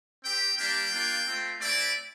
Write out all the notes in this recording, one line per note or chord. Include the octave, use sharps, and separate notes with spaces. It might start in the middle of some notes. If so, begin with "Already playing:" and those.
C4 G4 G5
G3 A#3 D4 G4 G5
A#3 D4 F4
A3 C4 F4
A3 C4 E4 D5